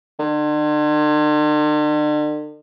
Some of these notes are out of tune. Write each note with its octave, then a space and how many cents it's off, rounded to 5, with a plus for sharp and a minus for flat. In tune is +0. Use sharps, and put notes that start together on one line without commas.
D3 +45